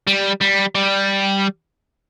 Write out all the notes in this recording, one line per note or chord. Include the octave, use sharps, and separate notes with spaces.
G3
G3
G3